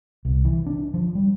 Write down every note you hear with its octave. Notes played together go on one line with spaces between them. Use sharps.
C2
E3
D4
F3
G3